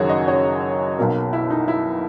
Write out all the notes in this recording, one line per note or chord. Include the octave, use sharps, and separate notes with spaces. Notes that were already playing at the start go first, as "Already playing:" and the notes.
Already playing: F#1 F#2 D#3 F#3 F#4 G#4 C#5
D#5
C#5
B1 B2 A#3 A#4
E4
D#4
E4